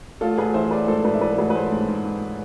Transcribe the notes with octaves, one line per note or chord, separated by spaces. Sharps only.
A1 F4 A4
A1 G#4 B4
E3 C5 E5
A1 B4 D5
G#2 A4 C5
G#2 B4 D5
E5
E3 B4 D5
A4
A1 G#4 B4
B4
A1 A4 C5
G#2
G#2
G#2